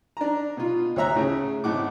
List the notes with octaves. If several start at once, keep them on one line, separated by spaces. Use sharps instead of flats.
D4 A#5
B2 F4
D2 C#5 E5 A#5 F#6
A2 C#3
G#1 A2 F#5 D6